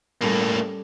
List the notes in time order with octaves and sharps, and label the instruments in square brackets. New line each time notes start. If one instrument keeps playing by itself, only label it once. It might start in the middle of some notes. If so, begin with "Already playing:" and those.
[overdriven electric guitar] A2 A#3 [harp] G3 C#4 A4